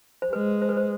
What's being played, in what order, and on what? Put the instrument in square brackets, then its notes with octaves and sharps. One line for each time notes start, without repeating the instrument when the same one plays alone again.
[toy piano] C5
[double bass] G#3 [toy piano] B4
[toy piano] C5
B4
C5